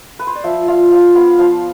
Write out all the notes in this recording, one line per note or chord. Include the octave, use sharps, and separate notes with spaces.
B4
C5
D5
F3 E5
F4 F5
F3 F5
B3 F5
F3 F5